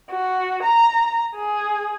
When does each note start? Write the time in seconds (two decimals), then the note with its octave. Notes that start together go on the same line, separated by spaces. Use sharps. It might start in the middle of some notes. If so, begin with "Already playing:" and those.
0.10 F#4
0.63 A#5
1.36 G#4